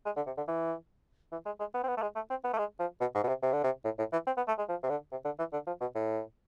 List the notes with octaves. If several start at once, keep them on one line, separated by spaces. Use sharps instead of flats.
G#3
D3
C3
D3
E3
E3
G#3
G#3
B3
C4
B3
A3
G#3
A3
C4
B3
A3
G#3
F3
B2
G#2
B2
C3
C3
D3
C3
A2
A2
E3
C4
B3
A3
G#3
F3
C3
D3
C3
D3
E3
D3
F3
B2
A2